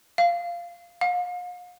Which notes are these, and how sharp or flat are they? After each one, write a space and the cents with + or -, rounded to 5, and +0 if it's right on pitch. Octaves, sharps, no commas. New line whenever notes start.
F5 -10
F5 +40